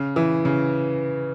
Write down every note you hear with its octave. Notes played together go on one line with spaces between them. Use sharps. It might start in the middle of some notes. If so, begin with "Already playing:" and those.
Already playing: C#3
E3
C#3